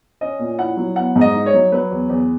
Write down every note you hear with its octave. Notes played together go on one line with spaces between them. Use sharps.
C#4 D#5
A#2
E4 F#5
F#3
B3 F#5
G#2
D#5
D#4
C#5
F#3
F#3 B4
E2
E2